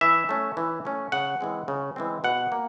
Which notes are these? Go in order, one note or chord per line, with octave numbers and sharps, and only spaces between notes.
E3 E5
A3 C#4
E3
A3 C#4
C#3 F#5
E3 G#3 C4
C#3
E3 G#3 C4
B2 F#5
A#3